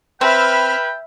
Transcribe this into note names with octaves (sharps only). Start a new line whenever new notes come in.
C4 B4 E5 G5 B5 F6